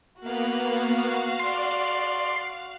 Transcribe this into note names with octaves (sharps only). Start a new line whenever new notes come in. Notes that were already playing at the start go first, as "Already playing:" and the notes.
A#3 B3 F#4 F5
D5 C6